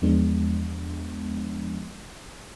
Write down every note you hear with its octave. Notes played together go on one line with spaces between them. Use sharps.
E2 F3 G#3 B3 D4